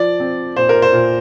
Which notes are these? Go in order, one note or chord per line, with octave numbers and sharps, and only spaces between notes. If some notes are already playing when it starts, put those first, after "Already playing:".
Already playing: F3 D5
C4
A#2 C5
A#4
C5
A#2